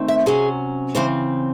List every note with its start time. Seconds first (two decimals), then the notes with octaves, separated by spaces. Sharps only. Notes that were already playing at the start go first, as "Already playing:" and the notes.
Already playing: D#3 A3 C4
0.08 E5
0.26 C3 F#3 C#4 G#4
0.95 C#3 E3 C4 C5